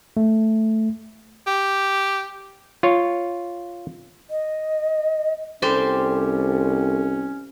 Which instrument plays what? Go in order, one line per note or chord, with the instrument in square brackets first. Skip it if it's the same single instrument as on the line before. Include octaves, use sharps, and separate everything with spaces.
[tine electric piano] A3
[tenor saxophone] G4
[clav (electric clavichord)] F4 C#5
[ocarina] D#5
[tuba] C2 [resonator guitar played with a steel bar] G3 G4 C5 [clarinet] C#4 [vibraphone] A4